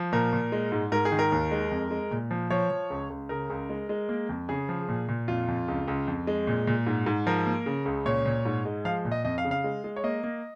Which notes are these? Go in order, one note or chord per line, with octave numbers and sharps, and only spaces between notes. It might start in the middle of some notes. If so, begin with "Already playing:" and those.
Already playing: F3
A#2 A#4
A#2
G#3
G#2
G#2 A#4
G#4
D#3
A#4
D#2
G#3
F2
G#3
A#2
F3
F3 C#5
F3
C#2
C#2
C#3 A#4
C#2
G#3
G#3
A#3
F2
C#3 G#4
F3
A#2
A#2
F2 F4
F2
C#2
C#2
F2
G#3
A#2
A#2
G#2
G#2
F3 A#4
A#3
C#3
C#2
A#2 C#5
A#2
G#2
G#3
F3 F5
A#2
D#5
F2 D#5
F5
C#3
F5
G#3
G#3
C#5
A#3 D#5
A#3